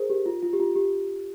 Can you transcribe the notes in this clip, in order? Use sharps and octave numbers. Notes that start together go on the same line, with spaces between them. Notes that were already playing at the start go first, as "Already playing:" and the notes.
Already playing: G#4 A#4 C5
G4
F4
F4
G4
F4
G4